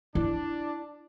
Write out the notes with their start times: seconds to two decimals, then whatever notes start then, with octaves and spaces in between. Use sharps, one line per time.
0.15 D4 E4